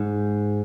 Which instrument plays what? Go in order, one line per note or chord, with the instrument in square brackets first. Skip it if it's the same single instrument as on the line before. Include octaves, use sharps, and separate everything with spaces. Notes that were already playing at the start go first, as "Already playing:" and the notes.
Already playing: [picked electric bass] G#2